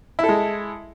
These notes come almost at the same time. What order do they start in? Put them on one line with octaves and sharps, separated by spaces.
E4 A4 G#3